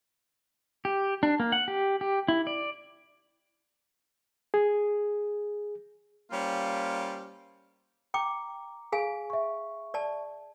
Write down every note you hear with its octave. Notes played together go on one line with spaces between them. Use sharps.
G4
D4
A#3
F#5
G4
G4
E4
D5
G#4
G3 A#3 C#4 F4 C5 F5
G5 A#5 D6
G#4 F5 G#5
E5 C#6
D5 A5